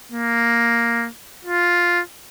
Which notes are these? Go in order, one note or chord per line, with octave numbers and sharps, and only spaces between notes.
A#3
F4